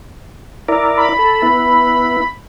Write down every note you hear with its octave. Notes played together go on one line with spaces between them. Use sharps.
E4 A#4 D5
B5
A4
B3 E4